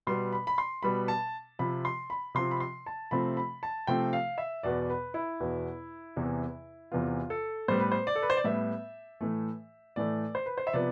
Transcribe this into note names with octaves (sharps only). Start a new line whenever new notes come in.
B2 G3 B3 C6
B5
B5
C6
B2 G3 B3 B5
A5
C3 F3 C4 B5
C6
B5
C3 F3 C4 C6
B5
C6
A5
C3 F3 A3 C4 B5
B5
A5
C3 F3 A3 C4 G5
F5
E5
E2 B2 B3 D5
B4
E4
E2 B2 B3
E2 C3 E3 B3
E2 C3 E3 B3 F4
A4
A2 G3 B3 C5
B4
C5
D5
A4
B4
C5
D5
A2 G3 B3 E5
A2 E3 A3
A2 E3 A3 D5
C5
B4
C5
E5
C3 F3 B3 D5